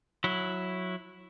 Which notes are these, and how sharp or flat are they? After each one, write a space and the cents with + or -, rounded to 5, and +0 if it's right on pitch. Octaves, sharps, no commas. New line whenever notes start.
F#3 -15 E4 +0